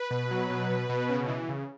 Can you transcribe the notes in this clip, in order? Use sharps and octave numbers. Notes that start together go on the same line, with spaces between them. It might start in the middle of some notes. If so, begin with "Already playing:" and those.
Already playing: B4
B2
F#3
B2
B2
B2
C#3
E3
C#3